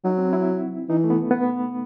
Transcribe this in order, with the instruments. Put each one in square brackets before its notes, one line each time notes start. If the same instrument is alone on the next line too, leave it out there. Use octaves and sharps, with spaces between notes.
[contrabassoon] F#3 [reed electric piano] D#4
[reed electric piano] C4
E4
[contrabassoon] E3 [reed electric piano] D#4
[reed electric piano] A3
B3
B3